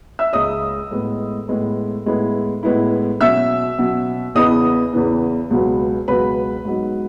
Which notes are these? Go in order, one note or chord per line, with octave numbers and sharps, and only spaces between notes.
E5 E6
C#2 C#3 G#3 D#5 D#6
A2 G#3 B3
A2 G#3 B3
A2 G#3 B3 E4
A2 G#3 B3 E4
B2 F#3 C#4 E5 E6
B2 F#3 C#4
E2 C#3 E3 B3 D#5 D#6
E2 C#3 E3 B3
C#2 B2 F#3 B3
C#2 B2 F#3 B3 B4 B5
G#2 F#3 B3 D#4